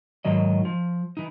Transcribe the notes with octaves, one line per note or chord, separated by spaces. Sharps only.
G#2 D#3 F#3 D#5
F3
E3 D#4